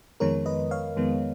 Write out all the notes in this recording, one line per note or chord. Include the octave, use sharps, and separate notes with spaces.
F2 D#3 G#3 B3 A#4 C#5
B4 D#5
C#5 F5
F2 D#3 G#3 B3